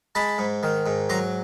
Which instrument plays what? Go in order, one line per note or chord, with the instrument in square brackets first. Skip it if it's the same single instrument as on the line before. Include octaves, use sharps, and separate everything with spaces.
[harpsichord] G#3 A5 B5
G#2
D#3
G#2
F#3 A#5 C6